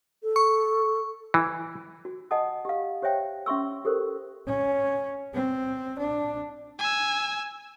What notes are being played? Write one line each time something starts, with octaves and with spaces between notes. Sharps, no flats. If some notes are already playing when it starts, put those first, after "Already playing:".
A4
C#6
E3
F#4
D#5 F#5 G#5 A5 D#6
G4 F5
G4 C5 C#5 E5 G5
C#4 E5 C6 C#6 E6
G4 A4 A#4 C5
C#4
C4
D4
G#5 E6